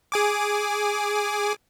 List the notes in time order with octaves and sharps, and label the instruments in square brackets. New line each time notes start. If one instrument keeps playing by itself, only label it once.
[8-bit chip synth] G#4 G#5 D6